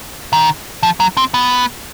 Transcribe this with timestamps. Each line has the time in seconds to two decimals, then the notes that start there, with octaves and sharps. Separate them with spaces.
0.33 D#3
0.83 F3
1.00 F#3
1.17 C4
1.34 B3